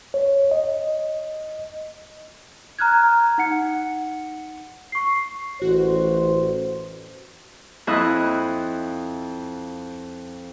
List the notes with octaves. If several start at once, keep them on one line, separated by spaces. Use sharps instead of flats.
C#5
D#5
A#5 F6 F#6 G#6
D#4 F#5 C#7
C#6 C7
A1 F#4 C5
F2 E4 D#5 D#6 E6 F#6